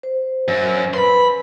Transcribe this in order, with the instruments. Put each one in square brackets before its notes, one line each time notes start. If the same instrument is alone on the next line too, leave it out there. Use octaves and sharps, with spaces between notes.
[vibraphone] C5
[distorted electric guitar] F#2
[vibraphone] B4 [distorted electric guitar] B5 C6